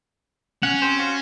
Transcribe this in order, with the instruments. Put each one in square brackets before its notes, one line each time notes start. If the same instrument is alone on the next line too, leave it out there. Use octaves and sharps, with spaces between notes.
[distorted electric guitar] C#4 [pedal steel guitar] F#5
[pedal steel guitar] C4 G4 C5
F4 F#4 C5